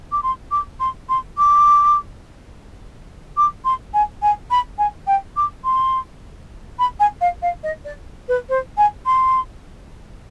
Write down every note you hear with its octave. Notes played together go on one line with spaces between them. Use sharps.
D6
C6
D6
C6
C6
D6
D6
C6
G#5
G#5
B5
G#5
G5
D6
C6
B5
G#5
F5
F5
D#5
D5
B4
C5
G#5
C6